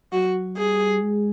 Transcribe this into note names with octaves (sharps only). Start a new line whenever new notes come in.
F#3 F#4
G3 G#4
G#3